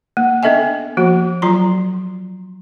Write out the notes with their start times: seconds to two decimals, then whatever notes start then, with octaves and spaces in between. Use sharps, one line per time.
0.17 A#3
0.43 B3 D4 A4 D#5 E5 G#5
0.97 F3 A#3 F#4
1.42 F#3 F4 A#5 C6